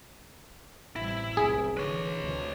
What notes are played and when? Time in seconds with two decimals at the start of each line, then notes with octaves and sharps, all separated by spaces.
0.96 A1 C3 G3 E4
1.37 F1 B1 C3 G#4
1.77 D3 E3 B4 C#5
2.21 D2 C3